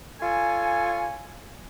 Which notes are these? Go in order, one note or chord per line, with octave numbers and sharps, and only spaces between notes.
F4 A4 C#5 G#5